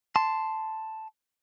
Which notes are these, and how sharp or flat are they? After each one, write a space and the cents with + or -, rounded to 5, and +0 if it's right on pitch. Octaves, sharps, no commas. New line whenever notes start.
A5 +0 C6 -5